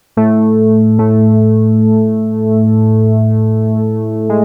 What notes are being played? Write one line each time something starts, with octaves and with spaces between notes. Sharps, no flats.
A2 A3
A2 A3
G#3